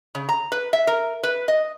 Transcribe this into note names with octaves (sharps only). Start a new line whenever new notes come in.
C#3
A#5
B4
E5
A#4
B4
D#5